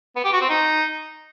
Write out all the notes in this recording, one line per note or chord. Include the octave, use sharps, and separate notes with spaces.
B3
G4
F#4
C4
D#4